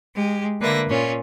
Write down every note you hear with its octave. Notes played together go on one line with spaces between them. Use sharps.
G#3 G4
D3 A#3 B4 E5 A#6
A#2 C#4 F4